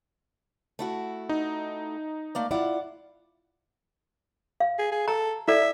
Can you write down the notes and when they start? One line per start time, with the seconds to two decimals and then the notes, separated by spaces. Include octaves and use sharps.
0.79 A3 E4 F#4
1.29 D#4
2.35 A3 A#3 D5
2.51 E4 F4 D5 F#5
4.60 F5
4.79 G#4
4.91 G#4
5.08 A4 A#5
5.48 E4 A4 D5 E5